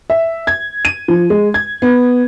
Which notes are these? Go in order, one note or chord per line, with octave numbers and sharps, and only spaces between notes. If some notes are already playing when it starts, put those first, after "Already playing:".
E5
G#6
D#7
F3
G#3
G#6
B3